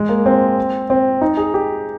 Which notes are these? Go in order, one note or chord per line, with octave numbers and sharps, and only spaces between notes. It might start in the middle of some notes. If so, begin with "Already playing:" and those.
Already playing: G#3
A#3
C4
C4
D#4
G#4
G4